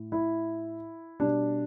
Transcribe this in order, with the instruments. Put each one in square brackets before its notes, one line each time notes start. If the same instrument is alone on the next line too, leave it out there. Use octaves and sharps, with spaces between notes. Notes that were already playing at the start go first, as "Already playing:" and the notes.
Already playing: [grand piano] A2
E4
B2 G3 D4